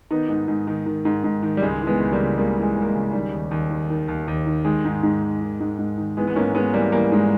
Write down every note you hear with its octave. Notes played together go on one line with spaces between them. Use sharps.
D#3 B3 D#4
G#2
G#2
D#3
D#3
G#2
G#2
D#3
G3
C#2 G#3
E3
G#3 B3
C#2
G3 A#3
C#3
C#2 G3 A#3
E3
G#3
C#2
A#3
G#3
C#3
D#3 G3
D#2
D#2
D#3
D#3
D#2
D#2
D#3
D#3 G#3
G#2
G#2
D#3
D#3
G#2
G#2
D#3
E3 G#3 B3
B3
G#2 A#3 C#4
G#2 G#3 B3
E3 G3 A#3
E3 G3 A#3
G#2 G#3